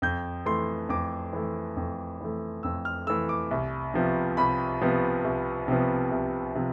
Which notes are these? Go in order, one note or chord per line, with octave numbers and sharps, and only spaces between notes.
F2 G6
E3 A3 C6
F2 D6
E3 A3
F2
E3 A3
F2 E6
F6
E3 A3 E6
D6
C2
C3 F3 B3
C2 B5
C3 F3 B3
C2
C3 F3 B3
C2
C3 F3